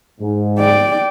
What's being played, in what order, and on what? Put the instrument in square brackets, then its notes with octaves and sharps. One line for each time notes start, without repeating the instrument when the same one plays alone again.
[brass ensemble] G#2
[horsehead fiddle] D5 G5